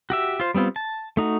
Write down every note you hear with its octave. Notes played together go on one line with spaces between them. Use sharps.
F#4 G4 E5
F4 C5
G3 B3 C4 F4
A5
A3 D#4 F#4